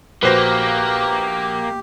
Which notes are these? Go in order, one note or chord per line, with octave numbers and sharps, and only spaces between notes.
A#1 A#3 F#4 G4 B4 C5 A#6